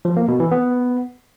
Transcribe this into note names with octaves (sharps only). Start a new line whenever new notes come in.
F3
A#3
B2
E3
B3